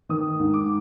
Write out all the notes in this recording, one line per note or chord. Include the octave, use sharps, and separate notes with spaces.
D#3 D#6
G#2
D6